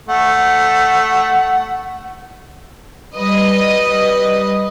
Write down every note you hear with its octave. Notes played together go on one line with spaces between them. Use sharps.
A3 F#5
G3 B4 D#5